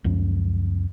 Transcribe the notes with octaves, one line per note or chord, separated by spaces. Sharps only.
C#2 F#2 F3